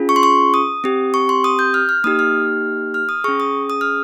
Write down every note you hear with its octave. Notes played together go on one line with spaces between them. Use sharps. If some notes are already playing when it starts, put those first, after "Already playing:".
Already playing: C#4 F4 G#4
C#6
C6
C#6
D#6
C4 G4
C#6
C6
D#6
G6
F6
F6
A#3 D#4 G4 D#6
F6
F6
D#6
C#4 G#4 C#6
D#6
D#6
F6